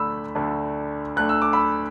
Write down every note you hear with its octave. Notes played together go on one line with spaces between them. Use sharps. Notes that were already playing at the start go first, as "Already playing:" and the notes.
Already playing: D2 D3 A3 D4 B5 E6
D2 D3 A3 D4
D2 D3 A3 D4 F#6
E6
D6
B5 E6